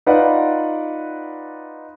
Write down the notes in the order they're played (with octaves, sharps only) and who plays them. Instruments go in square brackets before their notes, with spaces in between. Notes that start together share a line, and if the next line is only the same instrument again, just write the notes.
[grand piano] D#4 F4 B4 D5 F5 F#5